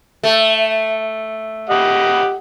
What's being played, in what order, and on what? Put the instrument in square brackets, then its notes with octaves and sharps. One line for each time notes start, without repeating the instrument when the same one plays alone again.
[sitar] A3
[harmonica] G4 D#5 F#5